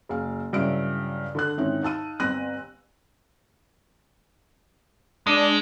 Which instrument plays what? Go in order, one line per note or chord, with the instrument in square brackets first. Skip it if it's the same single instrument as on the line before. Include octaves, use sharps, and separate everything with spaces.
[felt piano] F#1 F5
G2 C#3 F#3 E4 E6 D7
D3 D4 F#6
G#2 D#3 C4 C#4 D#4 E4
D#4 F5 A5 E6 D#7
G1 C4 F#6 A#6 D#7
[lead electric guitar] G#3 [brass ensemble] D4